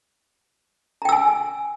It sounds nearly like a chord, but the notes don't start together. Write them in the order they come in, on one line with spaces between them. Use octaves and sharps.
A#5 G5 E6 G#5